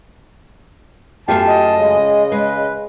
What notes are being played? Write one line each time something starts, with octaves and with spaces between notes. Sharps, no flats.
F#2 A3 F4 G4 A5
D#5
C#3 G#3
G#3 B4